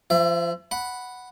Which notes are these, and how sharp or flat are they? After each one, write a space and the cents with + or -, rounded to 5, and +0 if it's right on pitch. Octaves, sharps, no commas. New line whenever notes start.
F3 -25 E5 +30
F#5 +0 B5 +0